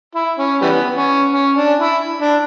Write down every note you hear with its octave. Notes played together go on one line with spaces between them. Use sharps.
E4
C#4
E3 G3 B3
C#4
C#4
D4
E4
D4